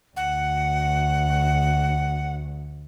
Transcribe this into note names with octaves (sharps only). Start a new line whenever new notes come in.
D2 F#5